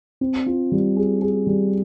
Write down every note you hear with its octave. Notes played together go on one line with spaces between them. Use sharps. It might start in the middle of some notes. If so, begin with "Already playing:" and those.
C4
F4
G3
G#4
G#4
G3